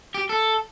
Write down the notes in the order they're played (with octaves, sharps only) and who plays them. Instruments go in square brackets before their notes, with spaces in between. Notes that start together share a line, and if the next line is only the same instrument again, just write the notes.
[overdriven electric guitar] G4
A4